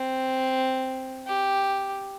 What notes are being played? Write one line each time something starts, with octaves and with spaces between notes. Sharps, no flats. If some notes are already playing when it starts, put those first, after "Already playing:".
Already playing: C4
G4